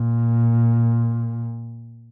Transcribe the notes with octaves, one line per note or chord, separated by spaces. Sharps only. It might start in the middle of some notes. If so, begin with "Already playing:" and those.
Already playing: A#2